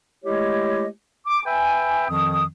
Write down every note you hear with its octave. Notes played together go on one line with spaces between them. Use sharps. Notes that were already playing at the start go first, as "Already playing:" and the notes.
G#3 A3 E4 G4 C#5 D#5
D6
B4 E5 G5 G#5
F2 D#3 F3 C4 D#6